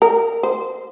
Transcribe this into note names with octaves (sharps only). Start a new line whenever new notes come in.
A#4
C5